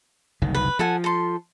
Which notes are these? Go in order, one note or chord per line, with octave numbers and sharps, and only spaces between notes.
F#1 C2 D#3
B4
F3 A4 F#5 G#5
A4 C6